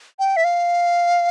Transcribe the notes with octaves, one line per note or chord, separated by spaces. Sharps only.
G5
E5
F5